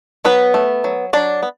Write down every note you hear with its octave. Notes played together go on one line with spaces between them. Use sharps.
F#3 B3 B4
A3
F#3
F#3 D4 D5
B3